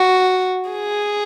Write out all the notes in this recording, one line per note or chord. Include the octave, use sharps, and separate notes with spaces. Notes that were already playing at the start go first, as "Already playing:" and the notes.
Already playing: F#4
G#4